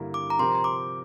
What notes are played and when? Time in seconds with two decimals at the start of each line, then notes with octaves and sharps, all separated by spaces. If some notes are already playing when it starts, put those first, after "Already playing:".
Already playing: G2 D3 G3 A#3 E4
0.14 D6
0.30 A#5
0.39 C3 F3 C4 G4 A#4 C6
0.64 D6